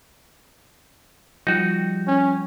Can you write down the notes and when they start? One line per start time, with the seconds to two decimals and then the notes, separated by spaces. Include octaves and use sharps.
1.47 F3 G3 D#4 F#4 G5
2.07 C#4